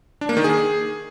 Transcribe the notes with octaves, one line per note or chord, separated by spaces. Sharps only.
D4
A#3
D#3
G#4